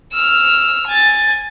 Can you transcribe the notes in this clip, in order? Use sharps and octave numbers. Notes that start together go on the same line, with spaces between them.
E6 F6
G#5 A6